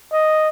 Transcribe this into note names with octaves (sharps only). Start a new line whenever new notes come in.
D#5